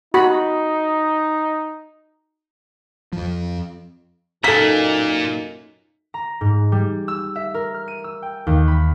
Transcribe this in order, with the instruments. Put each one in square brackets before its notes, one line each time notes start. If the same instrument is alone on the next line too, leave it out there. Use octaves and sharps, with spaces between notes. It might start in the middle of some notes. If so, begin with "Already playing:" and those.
[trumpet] D#4 [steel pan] F#4 B5
[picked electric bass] F2 F3
[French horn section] F#2 A#3 D#4 [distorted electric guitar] A#2 [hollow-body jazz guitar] A4 A#5 [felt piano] B6
[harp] A#5
G#2
G3
E6
E5
A#4
F6
D#7
E6
G5
D#2
B5